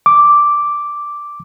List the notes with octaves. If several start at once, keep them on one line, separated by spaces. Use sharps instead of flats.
D6